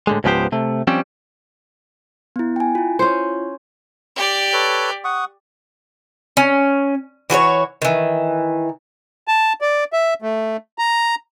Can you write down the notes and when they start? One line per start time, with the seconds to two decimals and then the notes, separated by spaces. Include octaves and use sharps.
0.07 A2 D3 G#3
0.24 C#2 G#2 F3 B3 G4 C5
0.52 C3 A3
0.87 F3 G3 C4 C#4
2.36 B3 E4
2.56 G5 G#5
2.75 E4 F4
2.99 C#4 C5
4.16 G4 D5
4.53 A4 B4 C#5
5.04 F#5 C#6 D#6
6.37 C#4
7.30 E3 F#4 B4 C#5
7.82 D#3 E3
9.28 A5
9.61 D5
9.93 E5
10.22 A3
10.78 A#5